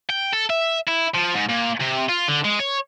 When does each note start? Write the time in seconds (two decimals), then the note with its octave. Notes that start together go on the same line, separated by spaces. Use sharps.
0.09 G5
0.33 A4
0.50 E5
0.87 E4
1.14 F3
1.34 G#2
1.49 A#2
1.80 C3
2.09 F4
2.28 D3
2.45 G#3
2.60 C#5